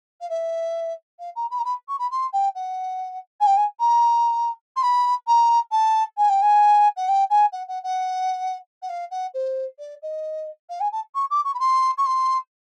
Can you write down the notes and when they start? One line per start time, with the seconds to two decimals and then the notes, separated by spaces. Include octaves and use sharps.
0.21 F5
0.29 E5
1.19 F5
1.36 A#5
1.51 B5
1.59 A#5
1.65 B5
1.88 C#6
1.99 B5
2.11 C6
2.33 G5
2.55 F#5
3.40 G#5
3.46 G5
3.57 G#5
3.79 A#5
4.76 C6
4.82 B5
5.27 A#5
5.72 A5
6.17 G#5
6.29 G5
6.42 G#5
6.96 F#5
7.08 G5
7.30 G#5
7.52 F#5
7.68 F#5
7.83 F#5
8.82 F#5
8.89 F5
9.11 F#5
9.34 C5
9.79 D5
10.02 D#5
10.69 F5
10.80 G#5
10.92 A5
11.15 C#6
11.30 D6
11.44 C#6
11.54 B5
11.59 C6
11.98 C#6
12.06 C6